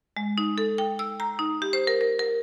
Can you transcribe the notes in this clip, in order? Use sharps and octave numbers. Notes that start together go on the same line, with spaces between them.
G#3
D#4
A4
G5
E6
A#5
D#4
G4
C5
A#4
A#4
A#4